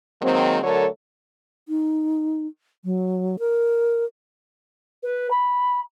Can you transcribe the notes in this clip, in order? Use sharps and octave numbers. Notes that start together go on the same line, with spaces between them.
D#3 F#3 G#3 A#3 C4
D3 F#3 A3 A4 A#4 C#5
D#4
F#3
A#4
B4
B5